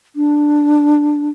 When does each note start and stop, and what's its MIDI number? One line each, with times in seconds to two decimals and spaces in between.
0.16 1.29 62